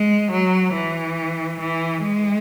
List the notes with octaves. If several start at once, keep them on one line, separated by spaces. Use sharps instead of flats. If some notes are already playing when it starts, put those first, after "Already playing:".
Already playing: G#3
F#3
E3
E3
G#3